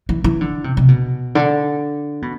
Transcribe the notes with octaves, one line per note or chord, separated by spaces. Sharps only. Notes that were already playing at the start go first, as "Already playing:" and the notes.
E3
E3
D3
C3
C3
B2
D3
B2